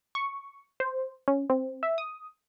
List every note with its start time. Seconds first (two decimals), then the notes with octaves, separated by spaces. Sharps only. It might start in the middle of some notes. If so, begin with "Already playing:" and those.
0.15 C#6
0.80 C5
1.28 C#4
1.50 C4
1.83 E5
1.98 D#6